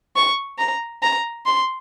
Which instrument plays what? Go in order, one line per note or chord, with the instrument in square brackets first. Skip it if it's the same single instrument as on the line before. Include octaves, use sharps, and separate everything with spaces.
[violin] C#6
A#5
A#5
C6